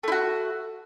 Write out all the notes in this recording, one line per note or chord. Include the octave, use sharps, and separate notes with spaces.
A3 E4 F#4